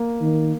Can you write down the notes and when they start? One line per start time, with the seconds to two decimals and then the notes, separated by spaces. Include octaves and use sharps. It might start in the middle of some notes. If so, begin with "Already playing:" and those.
Already playing: A#3
0.21 D#3